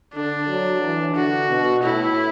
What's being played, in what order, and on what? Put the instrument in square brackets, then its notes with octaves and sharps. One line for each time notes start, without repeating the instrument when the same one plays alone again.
[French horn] D3 [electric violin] D4
[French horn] F#3
E3
[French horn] D3 [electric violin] F#4
[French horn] B2
[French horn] A2 [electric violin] E4